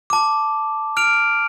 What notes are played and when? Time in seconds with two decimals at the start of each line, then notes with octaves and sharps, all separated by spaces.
0.10 A5 D6
0.97 F6 D7 F7